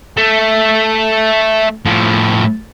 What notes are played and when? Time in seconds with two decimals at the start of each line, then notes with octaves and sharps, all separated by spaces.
0.17 A3
1.85 A2 F3